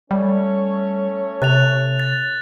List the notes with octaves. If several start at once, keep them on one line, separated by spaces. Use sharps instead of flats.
G3 A3 C#4 C#5
C3 F#6 A6 F7
A6